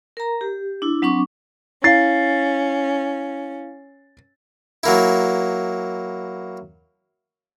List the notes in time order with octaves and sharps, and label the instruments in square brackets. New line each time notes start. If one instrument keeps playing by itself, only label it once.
[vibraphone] A#4 A#5
G4
D4 E4
F#3 C4 D4 C#6 D6
[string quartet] C#4 [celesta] E4 F5 [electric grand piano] A6 C7
[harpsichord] F#3 A#3 E4